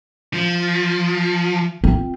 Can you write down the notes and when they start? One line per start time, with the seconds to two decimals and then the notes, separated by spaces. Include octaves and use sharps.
0.33 F3
1.84 C4 F4